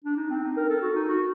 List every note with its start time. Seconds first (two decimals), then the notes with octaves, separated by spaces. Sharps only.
0.04 D4
0.17 D#4
0.30 C4
0.43 D#4
0.57 A#4
0.69 A4
0.81 F#4
0.95 D#4
1.08 F#4